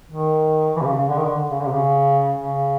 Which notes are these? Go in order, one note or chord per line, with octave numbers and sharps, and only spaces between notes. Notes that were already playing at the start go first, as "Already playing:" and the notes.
D#3
E3
C3
C#3
C#3
D3
D#3
D3
C#3
D3
C3
C#3
C#3